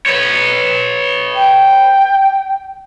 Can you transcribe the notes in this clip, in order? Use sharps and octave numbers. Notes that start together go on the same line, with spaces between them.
B4 C#5
G5